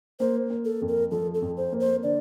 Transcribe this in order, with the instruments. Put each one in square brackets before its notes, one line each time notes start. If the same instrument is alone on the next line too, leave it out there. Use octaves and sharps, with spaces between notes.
[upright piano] A#3 [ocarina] C5
[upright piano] A#3
[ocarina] A4
[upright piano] F2
[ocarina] A#4
[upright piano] F3 [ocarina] A4
[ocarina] A4
[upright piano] F2
[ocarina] C5
[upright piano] A#3
[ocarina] C5
[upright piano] D3 [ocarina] D5